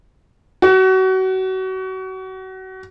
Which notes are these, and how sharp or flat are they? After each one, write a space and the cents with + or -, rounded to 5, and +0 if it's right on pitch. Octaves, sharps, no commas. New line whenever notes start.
F#4 +30